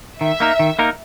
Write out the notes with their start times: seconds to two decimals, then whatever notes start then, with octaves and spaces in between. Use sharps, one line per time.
0.21 D#3 E5
0.40 A#3 D#4 A#4
0.59 D#3
0.79 A#3 D#4 A#4